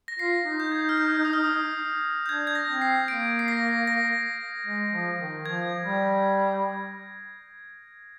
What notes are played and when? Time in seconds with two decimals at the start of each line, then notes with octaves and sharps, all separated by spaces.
0.08 A#6
0.19 F4 C7
0.45 D#4
0.60 G6
0.72 G#6
0.89 F6
0.98 G6
1.25 D#6
1.33 F6
1.44 D#6
2.26 G6
2.29 D4 G#6
2.47 G#6
2.55 A#6
2.69 C4
2.82 C7
3.08 A#3 D7
3.39 C7
3.48 A#6
3.87 A#6
4.66 G#3
4.93 F3
5.19 D#3
5.45 F3 G#6
5.84 G3